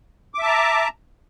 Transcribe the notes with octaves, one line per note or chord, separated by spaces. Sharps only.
E5 A5 A#5 D6